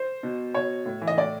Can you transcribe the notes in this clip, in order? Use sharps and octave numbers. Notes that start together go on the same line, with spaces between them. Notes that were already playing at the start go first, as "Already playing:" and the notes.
Already playing: C5
B2
B2 C#5
A2
E3
D#5
A2 D5